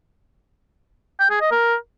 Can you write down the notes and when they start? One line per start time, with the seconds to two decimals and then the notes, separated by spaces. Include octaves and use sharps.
1.20 G5
1.30 G#4
1.41 D#5
1.51 A#4